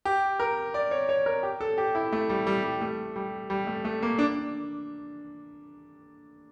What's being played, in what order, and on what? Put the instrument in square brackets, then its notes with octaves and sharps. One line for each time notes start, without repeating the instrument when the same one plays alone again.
[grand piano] G4
A#4
D5
C#5
C#5
A#4
G4
A4
G4
E4
A3
G3
G3
G3
A3
G3
G3
A3
A3
A#3
D4